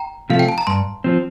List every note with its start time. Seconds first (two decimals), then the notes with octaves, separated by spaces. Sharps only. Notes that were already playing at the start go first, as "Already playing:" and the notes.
Already playing: G5 A#5
0.30 C3 F3 A3 F5
0.39 G5
0.48 A5
0.58 A#5
0.67 G2 A5 C6
1.04 F3 C4